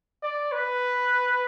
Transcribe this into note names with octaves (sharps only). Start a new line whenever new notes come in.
D5
B4